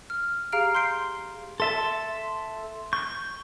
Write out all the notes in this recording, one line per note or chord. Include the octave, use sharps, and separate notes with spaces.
F6
G4 G#4 F5 A#5 F6 D7
C6 G6 C7 D7
A4 E5 A5 C6
C#6 G6